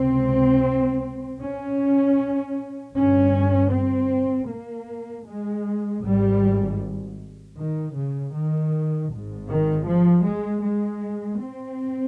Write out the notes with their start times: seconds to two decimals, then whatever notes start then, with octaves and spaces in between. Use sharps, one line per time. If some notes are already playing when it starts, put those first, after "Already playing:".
Already playing: C#2 C3 C4
1.40 C#4
2.94 G1 G2 C#4
3.72 C4
4.48 A#3
5.26 G#3
6.02 G#1 G#2 G3
7.57 D#3
7.96 C#3
8.34 D#3
9.11 G#1 G#2
9.49 D#3
9.88 F3
10.26 G#3
10.64 G#3
11.41 C4